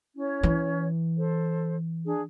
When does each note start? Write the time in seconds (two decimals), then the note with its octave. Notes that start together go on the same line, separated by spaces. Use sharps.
0.17 C#4 E4 C#5
0.43 E3
1.17 A4 C5
2.05 D4 G#4